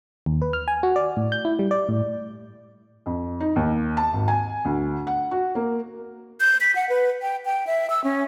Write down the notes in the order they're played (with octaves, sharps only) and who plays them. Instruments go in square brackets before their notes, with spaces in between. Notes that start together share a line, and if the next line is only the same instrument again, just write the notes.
[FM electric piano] D#2
B4
F6
G#5
F#4
D5
A2
G6
E4
G3
D5
A2
[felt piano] F2
D#4
D#2
A5
G#1
G#5
D2
F#5
F#4
A#3
[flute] G6
B6
F#5
B4
G5
G5
E5
E6
C#4